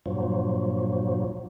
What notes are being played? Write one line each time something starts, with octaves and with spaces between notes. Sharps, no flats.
G2 A#2 F3 F#3